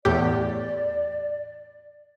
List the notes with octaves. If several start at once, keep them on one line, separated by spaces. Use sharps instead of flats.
E2 A2 G4 D5